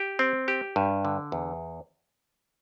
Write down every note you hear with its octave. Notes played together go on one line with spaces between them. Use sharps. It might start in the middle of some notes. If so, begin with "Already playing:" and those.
Already playing: G4
C4
G4
G2
D3
E2